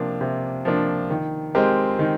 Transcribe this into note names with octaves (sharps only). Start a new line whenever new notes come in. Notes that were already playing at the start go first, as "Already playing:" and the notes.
Already playing: C3 F3 A#3 D4
C3
F3 A#3 D4
D#3
G#3 C4 G4 A#4
D#3